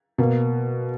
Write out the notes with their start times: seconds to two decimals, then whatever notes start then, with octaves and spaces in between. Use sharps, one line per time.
0.18 B2 A#3